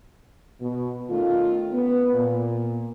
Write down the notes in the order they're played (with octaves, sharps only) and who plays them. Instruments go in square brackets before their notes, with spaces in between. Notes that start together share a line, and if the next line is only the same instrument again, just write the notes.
[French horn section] B2
D#3 A3 C#4 F4
B3
A#2